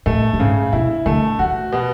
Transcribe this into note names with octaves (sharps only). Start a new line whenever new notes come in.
A2 A3
A2
G#2 C#3
B2 E4
D3 A3
E3 F#4
B2